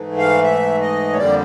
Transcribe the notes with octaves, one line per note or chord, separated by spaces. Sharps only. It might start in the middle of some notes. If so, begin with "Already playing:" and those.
Already playing: G#2 E3 A3
F5
E5
D#5
C#5
F2 D3 G3 A#3 D5